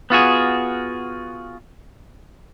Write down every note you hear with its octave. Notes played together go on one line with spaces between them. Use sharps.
B3 F4 F#4 G#4